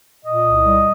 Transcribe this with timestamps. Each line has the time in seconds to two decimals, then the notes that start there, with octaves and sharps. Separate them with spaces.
0.25 A#2 D#5
0.45 C2
0.63 G3